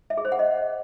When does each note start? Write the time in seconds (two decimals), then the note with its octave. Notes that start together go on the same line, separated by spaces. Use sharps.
0.10 E5
0.17 G#4
0.25 C5
0.32 F#5
0.39 D#5